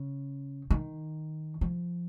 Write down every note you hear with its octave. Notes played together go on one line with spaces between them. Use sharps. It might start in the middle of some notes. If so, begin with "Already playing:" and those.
Already playing: C#3
D#3
F3